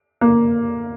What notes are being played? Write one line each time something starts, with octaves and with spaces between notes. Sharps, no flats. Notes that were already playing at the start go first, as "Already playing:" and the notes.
A#3